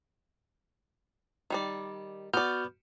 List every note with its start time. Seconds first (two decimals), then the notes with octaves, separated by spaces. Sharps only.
1.50 D#3 G3 D5
2.33 B3 F#4 D5 F6 G6